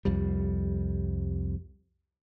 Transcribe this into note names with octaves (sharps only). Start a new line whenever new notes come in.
C2 F2 G3